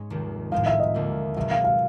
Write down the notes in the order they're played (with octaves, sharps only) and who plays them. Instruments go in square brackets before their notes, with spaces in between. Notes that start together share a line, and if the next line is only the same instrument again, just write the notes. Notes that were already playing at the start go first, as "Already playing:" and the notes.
Already playing: [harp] G#2 G#3 C#4
F1 D#2 D#3
[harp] A2 F3 G#3 C4 D#4 [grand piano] F5
[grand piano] E5
D#5
[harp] D#2 D3 F3 A#3
[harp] C#2 B2 F#3 [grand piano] E5
[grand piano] F5
F5